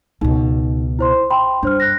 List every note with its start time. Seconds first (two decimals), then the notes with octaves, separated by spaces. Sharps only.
0.21 C#2 B2 D#4
0.99 E4 C5 C6
1.31 G5 B5 C6
1.63 G2 D4 C5 F6
1.80 F#6 A#6